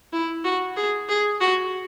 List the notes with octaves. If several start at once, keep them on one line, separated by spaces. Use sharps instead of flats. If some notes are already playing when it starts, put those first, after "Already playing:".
E4
F#4
G#4
G#4
F#4